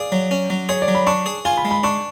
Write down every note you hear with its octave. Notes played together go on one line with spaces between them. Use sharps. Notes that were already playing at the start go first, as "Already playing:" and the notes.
Already playing: G#4 D5 F5
F#3
C#4
F#3
G#4 C#5
D5
F#3
B5
D4 C#6
G#4
F4 G#5
B5
G#3
B5
D4 C#6